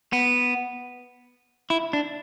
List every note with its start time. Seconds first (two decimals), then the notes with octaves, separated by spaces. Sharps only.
0.13 B3
1.70 E4
1.93 D4